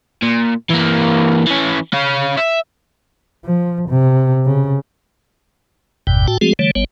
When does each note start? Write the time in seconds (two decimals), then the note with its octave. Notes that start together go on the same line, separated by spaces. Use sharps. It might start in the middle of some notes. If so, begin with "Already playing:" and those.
0.23 A#2
0.70 E3 A#3
1.46 E3 C#4
1.93 C#4 F5
2.38 E5
3.45 F3
3.89 C3
4.45 C#3
6.07 G1 E2 G2 B2 G5
6.28 A2 F#4 G5 A5
6.41 F3 G#3 A3 C4 F#4 G#4
6.59 D3 E3 G3 A3 C#5
6.75 G#1 G3 B3 C#5